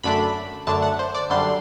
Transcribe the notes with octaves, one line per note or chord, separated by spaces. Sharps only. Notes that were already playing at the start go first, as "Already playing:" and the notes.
F#2 D3 A3 D4 B5
F#2 D3 A3 D4 A5
F#5
C5
D5
F#2 D3 G3 D4 C6